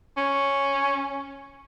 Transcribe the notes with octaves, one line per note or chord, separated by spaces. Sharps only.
C#4